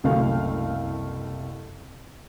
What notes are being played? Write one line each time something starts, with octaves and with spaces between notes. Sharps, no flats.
F#1 C2 C3 A3 F#4 F5